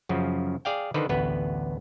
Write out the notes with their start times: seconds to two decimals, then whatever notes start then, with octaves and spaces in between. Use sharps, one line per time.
0.09 F#2 C#3 F3
0.65 G#4 D5 F5 G5
0.94 D3 D#3 B4 C5
1.09 A1 D2 B3 B4